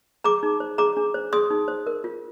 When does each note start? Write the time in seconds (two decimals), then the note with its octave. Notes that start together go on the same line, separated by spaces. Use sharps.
0.24 G#4 A#5 D6
0.43 D#4
0.60 C5
0.78 G#4 A#5 D6
0.97 D4
1.14 C5
1.33 G#4 C6 D#6
1.50 D#4
1.68 C5
1.87 A#4
2.04 F4